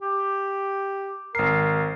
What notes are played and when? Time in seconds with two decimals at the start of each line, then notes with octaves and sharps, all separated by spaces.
0.01 G4
1.35 G#1 A#4 C7